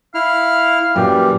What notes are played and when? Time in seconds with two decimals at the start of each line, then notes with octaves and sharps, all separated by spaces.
0.15 E4 F5 F6
0.96 F#2 A#2 E3 G3 G4